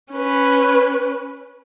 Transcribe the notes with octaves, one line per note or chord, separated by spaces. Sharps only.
C#4 B4